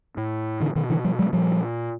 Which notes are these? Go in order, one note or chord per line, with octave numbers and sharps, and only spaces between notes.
A2
D3 E3
B2 D#3
D3 E3
F3 G3
F#3 G#3
A#2 F3 G3